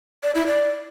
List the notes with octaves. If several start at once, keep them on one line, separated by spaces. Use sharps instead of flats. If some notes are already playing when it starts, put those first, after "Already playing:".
D5
E4
D5